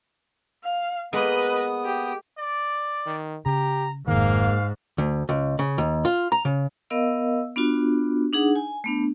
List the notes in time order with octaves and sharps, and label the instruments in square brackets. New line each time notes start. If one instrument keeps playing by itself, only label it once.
[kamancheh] F5
[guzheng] G#3 A#3 [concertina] B3 D#6 [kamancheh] B4 D#5
[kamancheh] G4
[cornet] D5
[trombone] D#3
[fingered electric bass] C#3 [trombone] G4 [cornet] A#5
[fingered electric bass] F1 D#3 [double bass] G#2 [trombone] A#3 [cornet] F5
[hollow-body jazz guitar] D2
C#2
C#3
D#2
F4
A#5
C#3
[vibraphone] B3 A#4 D#5 F5 E6
B3 D4 F4 F#4
D4 D#4 G#4 F#5
G#5
A3 B3 D4